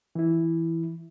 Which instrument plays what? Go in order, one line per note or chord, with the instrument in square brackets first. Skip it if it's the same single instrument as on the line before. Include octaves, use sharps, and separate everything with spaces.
[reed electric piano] E3 E4